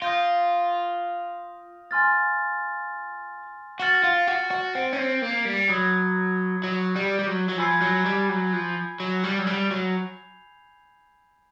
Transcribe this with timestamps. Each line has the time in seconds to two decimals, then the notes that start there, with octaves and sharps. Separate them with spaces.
0.02 F4 D#6 G6 A#6
1.91 G#5 C6 F6 A6
3.80 F#4 F6 A6 C#7 E7 G7
4.04 F4
4.27 F#4
4.51 F#4
4.75 C4
4.93 C#4
4.99 C4
5.22 A#3
5.45 G3
5.69 F#3 B5 D#6 G#6
6.64 F#3
6.96 G3
7.19 G3
7.27 F#3
7.49 F#3
7.58 F3 G#5 B5 E6 G#6 C7
7.81 F#3
8.06 G3
8.29 F#3
8.53 F3
9.00 F#3
9.23 G3
9.38 F#3
9.47 G3 G6 C7 F7
9.71 F#3